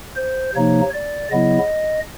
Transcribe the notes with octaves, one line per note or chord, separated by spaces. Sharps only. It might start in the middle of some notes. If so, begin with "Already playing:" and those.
C5
C3 F3 A#3 D#4 C#5
D5
C#3 F#3 B3 E4 D#5